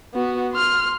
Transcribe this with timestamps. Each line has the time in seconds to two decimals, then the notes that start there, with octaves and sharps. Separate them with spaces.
0.14 B3 F#4
0.53 C6 F6